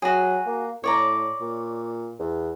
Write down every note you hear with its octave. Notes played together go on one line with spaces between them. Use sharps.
F#3 F#4 G#4
A#3
A2 C#5 D5 A#5
A#2
E2